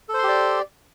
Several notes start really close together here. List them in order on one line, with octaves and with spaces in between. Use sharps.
A4 C5 C6 G4 D5